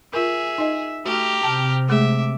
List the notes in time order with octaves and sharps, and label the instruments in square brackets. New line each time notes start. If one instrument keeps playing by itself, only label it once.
[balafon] F4 A#4 [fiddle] G#4 [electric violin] E5
[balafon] D#4 D#5
[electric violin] A3 F6 [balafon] F#4 [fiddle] G4 A#5
[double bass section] C3 [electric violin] G5 F6 [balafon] A5
[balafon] G#3 A3 G#4 [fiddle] E5 [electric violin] D6